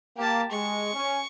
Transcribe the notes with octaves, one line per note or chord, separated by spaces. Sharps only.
A#3 G4 A5
G#3 C#6
C#4